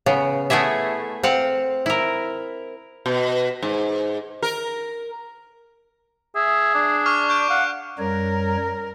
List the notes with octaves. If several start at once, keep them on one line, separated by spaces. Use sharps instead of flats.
C#3 B3
A3 B3 E4 G#4 E5
C4 F5 F#5
E4 A#4
B2
G#2
A#4
G#4 E5
D4
C#6 D6 F6
C#6 G6 D7
F5 F#5
F#2 G3 A#4 C#5